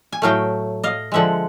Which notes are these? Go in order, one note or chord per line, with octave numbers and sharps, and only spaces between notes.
G#5
A2 F#3 A3 F5 G5
D#5 F5
D3 F3 G#3 E5 F#5